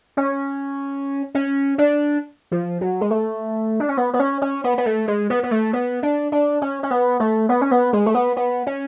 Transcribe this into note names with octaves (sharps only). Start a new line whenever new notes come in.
C#4
C#4
D4
F3
F#3
G#3
A3
D4
C#4
B3
B3
C#4
C#4
B3
B3
A3
G#3
B3
B3
A3
B3
D4
D4
C#4
C#4
B3
A3
B3
C#4
B3
G#3
A3
B3
B3
C#4